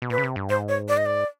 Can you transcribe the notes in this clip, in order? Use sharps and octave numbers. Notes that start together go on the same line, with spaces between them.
B2
A#2 B4
C#3
C3
G2
G#2 C5
C#5
D5
D#5
D5